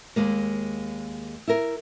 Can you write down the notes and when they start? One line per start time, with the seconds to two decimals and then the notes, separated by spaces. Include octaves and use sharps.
0.16 D#2 G#3 A#3
1.48 E4 A#4